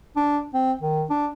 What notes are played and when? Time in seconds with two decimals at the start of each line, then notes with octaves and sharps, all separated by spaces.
0.16 D4
0.54 C4
0.81 D#3
1.10 D4